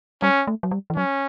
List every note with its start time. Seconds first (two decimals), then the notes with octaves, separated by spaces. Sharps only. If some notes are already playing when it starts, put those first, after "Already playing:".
0.22 G3 C#4
0.47 A3
0.63 F#3
0.71 G3
0.90 E3
0.96 F#3 C#4